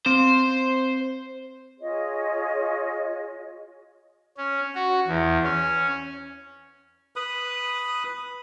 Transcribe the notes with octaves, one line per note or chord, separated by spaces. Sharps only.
C4 C5
F4 G#4 C#5 D#5
C#4
F#4
E2
C#4
B4 B5 D#6